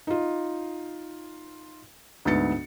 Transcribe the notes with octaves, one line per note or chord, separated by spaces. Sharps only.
D#4 F4
D2 G#2 B3 A6 C#7